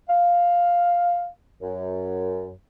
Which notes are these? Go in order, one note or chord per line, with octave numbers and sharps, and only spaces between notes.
F5
F#2